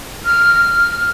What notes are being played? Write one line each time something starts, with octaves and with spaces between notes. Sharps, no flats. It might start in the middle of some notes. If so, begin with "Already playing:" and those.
F6